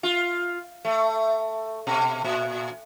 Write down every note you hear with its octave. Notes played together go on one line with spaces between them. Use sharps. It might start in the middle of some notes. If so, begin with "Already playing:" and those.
F4
A3
B2
A#2